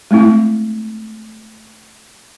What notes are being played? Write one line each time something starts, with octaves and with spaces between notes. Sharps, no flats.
G#3 A3 C4 E4